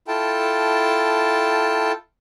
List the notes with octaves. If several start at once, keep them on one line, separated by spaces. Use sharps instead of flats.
E4 F4 A4 G5 A5